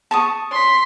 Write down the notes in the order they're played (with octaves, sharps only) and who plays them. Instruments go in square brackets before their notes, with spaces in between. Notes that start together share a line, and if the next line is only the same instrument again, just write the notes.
[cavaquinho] A5 C#6 D#6
[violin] C6 B6